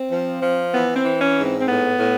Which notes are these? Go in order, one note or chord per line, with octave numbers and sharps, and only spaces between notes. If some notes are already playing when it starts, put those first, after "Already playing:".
Already playing: C4
F3
F3
E3 B3
C4
E3
C#4
G#2
C4
C4
A2 B3
A2